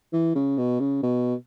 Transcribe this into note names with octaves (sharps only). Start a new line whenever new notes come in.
E3
C#3
B2
C#3
B2